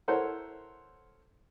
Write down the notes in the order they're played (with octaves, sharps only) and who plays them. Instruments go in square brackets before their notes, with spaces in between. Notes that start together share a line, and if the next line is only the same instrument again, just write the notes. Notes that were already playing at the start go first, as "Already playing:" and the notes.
[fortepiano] E4 A4 A#4 C5 C#5 F#5